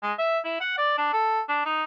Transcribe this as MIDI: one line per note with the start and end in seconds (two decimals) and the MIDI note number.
0.03 0.13 56
0.18 0.39 76
0.45 0.58 64
0.60 0.76 78
0.78 0.94 74
0.98 1.12 62
1.13 1.41 69
1.48 1.61 62
1.65 1.84 63